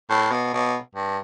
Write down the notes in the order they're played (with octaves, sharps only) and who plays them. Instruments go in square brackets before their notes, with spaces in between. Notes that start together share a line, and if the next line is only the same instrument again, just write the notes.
[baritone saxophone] A2
B2
B2
G2